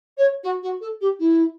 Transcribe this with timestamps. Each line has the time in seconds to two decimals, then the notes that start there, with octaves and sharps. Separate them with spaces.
0.17 C#5
0.43 F#4
0.62 F#4
0.80 A4
1.00 G4
1.19 E4